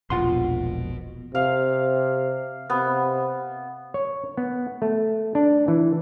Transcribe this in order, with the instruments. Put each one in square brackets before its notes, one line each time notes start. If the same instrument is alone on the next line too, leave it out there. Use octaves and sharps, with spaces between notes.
[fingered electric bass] E1 A#1 [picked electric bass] B2 [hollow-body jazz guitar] F4 F#5 C6
[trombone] C3 [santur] F5
[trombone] C3 [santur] B3
[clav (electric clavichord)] C#5
B3
A3
D4
E3